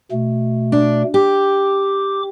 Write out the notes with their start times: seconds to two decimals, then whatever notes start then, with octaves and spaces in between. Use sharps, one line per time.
0.12 B2 A3
0.72 D4
1.14 G4 D6